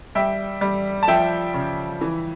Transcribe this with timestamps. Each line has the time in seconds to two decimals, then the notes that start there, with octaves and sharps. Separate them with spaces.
0.15 G3 E5 G5
0.61 G3
1.03 A5
1.08 F3 E5 G5
1.54 C#3
2.01 E3